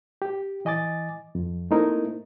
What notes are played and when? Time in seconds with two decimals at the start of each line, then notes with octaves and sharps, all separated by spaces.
0.22 G4
0.65 E3 D#5 G#5 D6 A6
1.35 F2
1.71 A3 A#3 C4 D#4 E4 A#4